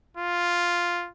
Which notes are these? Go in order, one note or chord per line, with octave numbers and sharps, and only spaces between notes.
F4